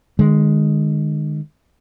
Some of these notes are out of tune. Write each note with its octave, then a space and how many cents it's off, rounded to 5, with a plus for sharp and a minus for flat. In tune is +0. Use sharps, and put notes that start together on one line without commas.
D#3 -40 G#3 +0